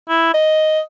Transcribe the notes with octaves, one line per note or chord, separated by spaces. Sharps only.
E4
D#5